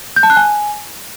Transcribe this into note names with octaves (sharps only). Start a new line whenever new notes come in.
G6
A5
F#6
G#5